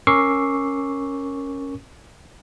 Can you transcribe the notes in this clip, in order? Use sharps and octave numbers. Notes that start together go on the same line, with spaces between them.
C#4 A#4 C#6 D6 E6 C7